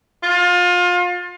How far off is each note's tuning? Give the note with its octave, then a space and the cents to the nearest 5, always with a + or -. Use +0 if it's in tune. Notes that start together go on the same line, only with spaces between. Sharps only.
F4 +30